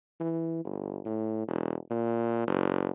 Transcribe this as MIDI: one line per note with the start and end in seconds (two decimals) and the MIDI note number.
0.20 0.63 52
0.65 1.00 31
1.06 1.44 45
1.48 1.76 28
1.90 2.46 46
2.47 2.91 30